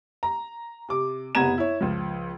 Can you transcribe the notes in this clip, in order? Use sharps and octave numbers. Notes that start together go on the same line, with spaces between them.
A#5
C3 D6
F#1 C3 B3 A#5 G#6 E7
E4 C#5
C#2 F3